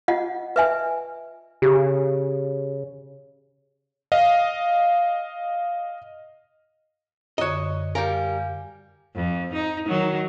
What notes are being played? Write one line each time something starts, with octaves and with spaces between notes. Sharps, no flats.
F4 D#5 F#5
B4 E5 G#5
C#3 G4
D#5 F5
F#2 D3 C#5 D#5
G3 A#4 F5 G#5
F2
D#4
D#3 F#3